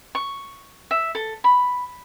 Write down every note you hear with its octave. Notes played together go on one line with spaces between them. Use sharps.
C#6
E5
A4
B5